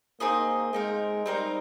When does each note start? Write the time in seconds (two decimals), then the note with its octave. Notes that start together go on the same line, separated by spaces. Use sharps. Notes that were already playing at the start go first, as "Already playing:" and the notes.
0.20 A#3 C4 D#4 G#4 D#5
0.73 G#3 C4 D#4 A#4
1.26 G3 C4 D#4 A#4